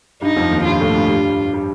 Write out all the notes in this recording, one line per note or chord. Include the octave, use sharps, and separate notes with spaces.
G2 G3 D#4
F2 F3
D#2 D#3
G2 G3 F4
A2 A3
G2 G3
G2 G3
G3